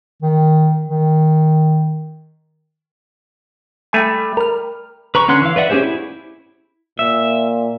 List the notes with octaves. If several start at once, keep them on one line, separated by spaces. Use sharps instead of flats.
D#3
D#3
G3 A3 G5 G#5
A#4 F6
B4 A#5 C#6
D3 C#4 F#5 C6 F#6
E3 F5
B4 D5 E5 F#5
C#4 D4 G4 G#4 C5
E4
A#2 E5